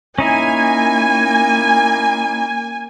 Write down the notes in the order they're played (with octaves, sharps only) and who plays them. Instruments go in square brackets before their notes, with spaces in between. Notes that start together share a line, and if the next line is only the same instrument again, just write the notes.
[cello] A#3 [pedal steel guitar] C#4 D#4 E4 [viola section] G#5